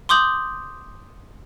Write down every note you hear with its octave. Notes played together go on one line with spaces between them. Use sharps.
C6 D6 D#6 G6 F#7